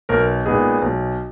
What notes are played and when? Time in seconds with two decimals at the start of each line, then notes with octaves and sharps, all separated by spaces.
0.09 B1 A#4
0.45 A#2 G#3 B3 D#4 G#4
0.82 B1